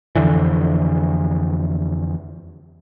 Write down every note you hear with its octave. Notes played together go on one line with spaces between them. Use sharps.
F2 D3 E3